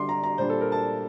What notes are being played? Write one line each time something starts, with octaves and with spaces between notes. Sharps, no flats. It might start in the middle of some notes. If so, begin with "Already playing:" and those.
Already playing: D3 G3 D4 C6 D6
A#5
A#5
A#2 G3 D4 C5
A4
A#4
A5